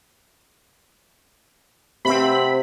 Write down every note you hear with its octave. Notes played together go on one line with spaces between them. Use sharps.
C3 C4 F#5 B5